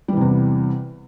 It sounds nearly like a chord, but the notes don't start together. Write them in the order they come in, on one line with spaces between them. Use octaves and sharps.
G3 E3 C3 E2